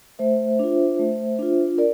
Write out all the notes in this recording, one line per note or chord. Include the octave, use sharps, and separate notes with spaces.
A3 C5 E5
D4 F4
A3
D4 F4
A#4 D5